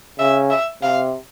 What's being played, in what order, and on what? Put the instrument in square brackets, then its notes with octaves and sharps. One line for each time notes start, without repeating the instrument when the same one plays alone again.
[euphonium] C#3 [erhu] E5
[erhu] E5
[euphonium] C3 [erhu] F5